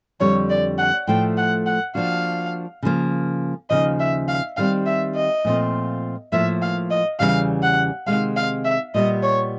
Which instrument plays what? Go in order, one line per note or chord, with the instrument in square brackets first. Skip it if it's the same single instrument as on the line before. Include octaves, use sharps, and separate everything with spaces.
[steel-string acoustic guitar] F2 D3 G3 [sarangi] C#5
[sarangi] D5
F#5
[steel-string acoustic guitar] A2 F3 A3 [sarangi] G5
[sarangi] F#5
F#5
[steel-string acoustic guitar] F3 A#3 D4 F#4 [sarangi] F5
[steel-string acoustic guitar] C#3 F3 A#3
[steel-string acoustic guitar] D#2 C#3 F3 [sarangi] D#5
[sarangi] E5
F5
[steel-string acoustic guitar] D#3 G3 C4 [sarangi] F5
[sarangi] E5
D#5
[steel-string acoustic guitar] A#2 F3 A3 C4 F4
[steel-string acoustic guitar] A2 F3 A#3 [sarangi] E5
[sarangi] F5
D#5
[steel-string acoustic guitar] E2 C#3 E3 G3 [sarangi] F5
[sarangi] F#5
[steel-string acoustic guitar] C3 D#3 G#3 C4 [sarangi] F5
[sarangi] F5
E5
[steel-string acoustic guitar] A#2 G3 B3 [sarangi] D#5
[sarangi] C#5